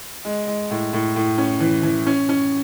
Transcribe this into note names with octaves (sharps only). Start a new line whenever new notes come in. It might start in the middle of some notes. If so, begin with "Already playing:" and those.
G#3
G#3
A2
A2
A2
C#4
E3
E3
C#4
C#4